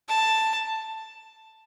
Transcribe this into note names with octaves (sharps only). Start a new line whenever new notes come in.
A5